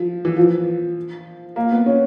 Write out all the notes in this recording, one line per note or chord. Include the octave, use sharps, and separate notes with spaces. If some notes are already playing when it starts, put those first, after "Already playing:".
Already playing: F3
E3
F3
A#3
B3
C#4